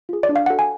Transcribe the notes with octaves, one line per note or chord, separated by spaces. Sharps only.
F4 G#4
D5
D4
F5
F#4 A4 F#5
G#5